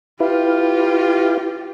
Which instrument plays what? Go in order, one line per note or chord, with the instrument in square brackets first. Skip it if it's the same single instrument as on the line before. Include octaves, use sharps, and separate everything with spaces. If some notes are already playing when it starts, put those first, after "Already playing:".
[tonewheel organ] E4 B4 F5 [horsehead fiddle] F4 G4